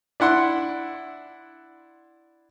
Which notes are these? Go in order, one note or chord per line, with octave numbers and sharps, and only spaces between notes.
D4 E4 F#5 C6